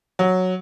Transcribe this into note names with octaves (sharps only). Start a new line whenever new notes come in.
F#3